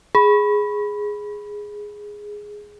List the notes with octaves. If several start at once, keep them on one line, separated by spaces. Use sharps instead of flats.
G#4 B5